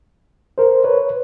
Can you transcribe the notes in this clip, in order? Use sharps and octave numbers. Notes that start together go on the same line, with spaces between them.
A#4 C5
B4 C#5